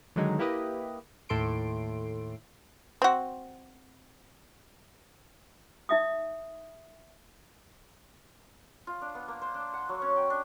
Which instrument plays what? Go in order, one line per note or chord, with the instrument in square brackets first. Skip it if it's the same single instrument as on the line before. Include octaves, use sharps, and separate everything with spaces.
[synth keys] D3 D#3 F#3 G#3 D#4
A#3 E4 G4 B4 D#5
D#2 A2 A4 C6 D7
[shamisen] C4 F#4
[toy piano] D#4 E5 D#6
[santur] F4
D4
B3
A#3
C5
D4
F#5
F#3
C#4
G5
D4